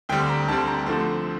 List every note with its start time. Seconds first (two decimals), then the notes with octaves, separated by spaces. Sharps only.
0.09 D2 D3 G3 C4 G5
0.29 A#5
0.48 D2 D3 G3 C4 A5
0.67 A#5
0.86 D3 F3 A3 C4